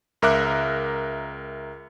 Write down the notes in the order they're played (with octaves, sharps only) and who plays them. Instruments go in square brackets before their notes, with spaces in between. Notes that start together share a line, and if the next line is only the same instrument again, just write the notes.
[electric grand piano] C#2 A#4 E5 D6 F#6